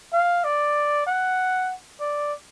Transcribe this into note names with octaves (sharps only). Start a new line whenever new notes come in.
F5
D5
F#5
D5